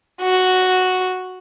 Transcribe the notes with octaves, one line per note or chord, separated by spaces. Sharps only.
F#4